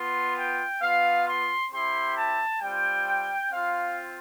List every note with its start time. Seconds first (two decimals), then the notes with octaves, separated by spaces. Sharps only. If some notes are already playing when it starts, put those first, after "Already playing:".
Already playing: B3 F4 C6
0.36 G5
0.81 B3 F4 F5
1.26 C6
1.72 C4 E4 G4 C6
2.16 A5
2.61 G3 C4 F4 G5
3.52 C4 F4 F5